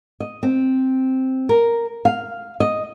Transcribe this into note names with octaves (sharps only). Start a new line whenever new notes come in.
D#5
C4
A#4
F5
D#5